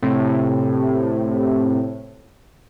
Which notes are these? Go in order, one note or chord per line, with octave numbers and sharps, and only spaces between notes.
A2 C3